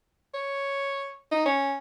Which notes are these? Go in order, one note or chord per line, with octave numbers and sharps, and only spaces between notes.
C#5
D#4
C#4